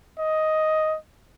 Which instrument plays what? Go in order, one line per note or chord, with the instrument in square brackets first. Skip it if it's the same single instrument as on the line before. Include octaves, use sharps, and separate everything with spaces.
[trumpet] D#5